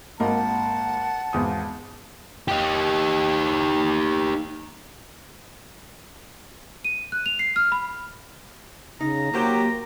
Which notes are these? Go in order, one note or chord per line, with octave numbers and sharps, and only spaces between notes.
G#1 A#3 D#5 F#5 A5
G#1 E2 D#6
D#4 G4
D#7
F#6
F7
C7
F6
B5
C#3 D#4 A#5
F#3 A#3 F4 G4 C5